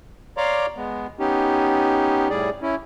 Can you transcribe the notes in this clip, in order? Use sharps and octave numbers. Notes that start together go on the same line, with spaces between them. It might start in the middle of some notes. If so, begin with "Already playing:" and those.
C#5 D5 F5 A#5 C6 D6
G#3 B3
B3 C#4 D#4 G4
A2 G3 G#4 D5
C#4 E4